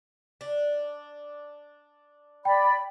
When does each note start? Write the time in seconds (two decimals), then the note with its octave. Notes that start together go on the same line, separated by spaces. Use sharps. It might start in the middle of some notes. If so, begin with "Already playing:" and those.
0.41 D4
2.45 D5 G5 B5